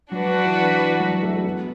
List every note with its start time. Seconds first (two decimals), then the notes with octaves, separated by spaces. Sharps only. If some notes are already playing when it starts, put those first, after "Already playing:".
0.12 F#3 D4 F#4 B4
0.45 E3
0.78 E3
1.00 F#3
1.23 A3
1.36 A3
1.44 B3